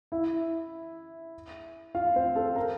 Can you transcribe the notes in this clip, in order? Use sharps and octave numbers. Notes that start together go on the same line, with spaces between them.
E4 E5
F4 F5
C4 C5
A4
A#4